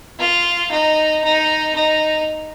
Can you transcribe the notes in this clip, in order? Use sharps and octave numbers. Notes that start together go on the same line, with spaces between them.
F4
D#4
D#4
D#4